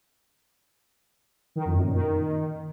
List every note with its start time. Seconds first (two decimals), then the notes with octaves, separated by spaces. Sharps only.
1.56 D#3
1.65 F2
1.74 F#2
1.83 A#2
1.93 D#3